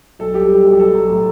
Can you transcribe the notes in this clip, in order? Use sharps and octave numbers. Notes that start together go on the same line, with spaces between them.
B1 A4
G3 G4
G3
B1
G4
B1 A4
F#3
A2